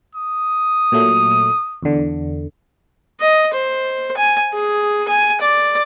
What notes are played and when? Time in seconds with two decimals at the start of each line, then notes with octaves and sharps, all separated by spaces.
0.15 D#6
0.92 A#2 F#3 A3
1.83 E2 D3
3.20 D#5
3.54 C5
4.17 G#5
4.53 G#4
5.08 G#5
5.41 D5